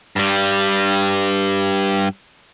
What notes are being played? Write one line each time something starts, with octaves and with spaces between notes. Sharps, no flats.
G2 G3